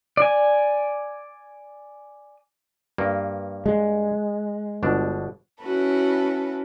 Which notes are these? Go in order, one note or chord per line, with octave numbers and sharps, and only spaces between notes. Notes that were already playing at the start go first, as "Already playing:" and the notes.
D5 G#5
G2 A#3
G#3
G1 B2 D4
C#4 E4 F#4 A4 B4